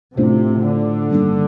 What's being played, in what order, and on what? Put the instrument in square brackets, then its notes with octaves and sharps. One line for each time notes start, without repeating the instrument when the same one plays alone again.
[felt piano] A2 A3 D4 F4 C5 [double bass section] C3
[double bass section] D3
[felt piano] G2 D#3 A#3 D4